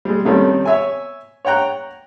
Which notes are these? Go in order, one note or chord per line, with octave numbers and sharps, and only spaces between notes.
G3 G#3
F2 C3 D#3 G3 A3 C#4
C#5 E5 G#5
C#5 F#5 G5 A#5 F#6